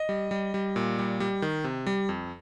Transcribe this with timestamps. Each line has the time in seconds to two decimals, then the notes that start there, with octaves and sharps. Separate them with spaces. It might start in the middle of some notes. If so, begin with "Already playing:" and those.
Already playing: D#5
0.09 G3
0.31 G3
0.54 G3
0.76 A#2
0.99 G3
1.20 G3
1.42 D#3
1.64 C3
1.87 G3
2.09 F2